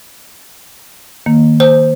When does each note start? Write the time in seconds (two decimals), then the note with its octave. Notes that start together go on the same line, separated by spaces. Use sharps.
1.26 D#3 A#3
1.60 C5